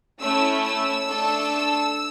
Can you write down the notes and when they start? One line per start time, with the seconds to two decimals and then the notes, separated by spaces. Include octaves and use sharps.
0.21 A3 C#4 E4 E6
0.65 E6
1.08 A3 D4 A4